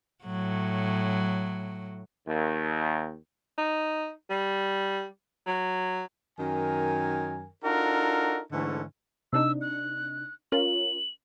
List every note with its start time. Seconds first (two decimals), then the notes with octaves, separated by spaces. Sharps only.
0.24 A2 F#3
2.27 D#2
3.58 D#4
4.30 G3
5.46 F#3
6.39 F#2 D#3 A#4 G#5
7.64 D4 D#4 F4 F#4 A4 A#4
8.52 G#2 D3 E3 G#3 A3 C#4
9.33 C3 D4 D#4 E6
9.61 F#6
10.52 C#4 F4 A#4 F#7